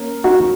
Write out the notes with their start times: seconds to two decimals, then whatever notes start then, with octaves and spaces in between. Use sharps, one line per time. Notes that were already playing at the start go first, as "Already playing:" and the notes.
Already playing: A#3 C#4 A#4
0.24 D#4 F#4